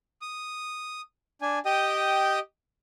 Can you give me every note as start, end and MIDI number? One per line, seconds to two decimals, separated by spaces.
0.22 1.01 87
1.42 1.59 62
1.42 1.59 80
1.66 2.39 67
1.66 2.39 75
1.66 2.39 79
1.66 2.39 87